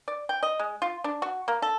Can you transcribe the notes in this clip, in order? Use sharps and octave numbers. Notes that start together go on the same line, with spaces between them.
D5
G5
D#5
G#3
F4
D4
F#4
A#3
A4